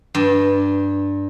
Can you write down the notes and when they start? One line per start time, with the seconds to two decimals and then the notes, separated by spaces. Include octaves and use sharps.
0.15 G2